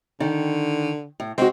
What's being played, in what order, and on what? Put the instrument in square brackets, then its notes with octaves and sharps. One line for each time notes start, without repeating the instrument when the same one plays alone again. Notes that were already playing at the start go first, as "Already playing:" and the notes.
[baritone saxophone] D3 [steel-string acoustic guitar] D#3
[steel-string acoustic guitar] A2
[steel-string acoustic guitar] G#3 F#4 [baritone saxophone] C4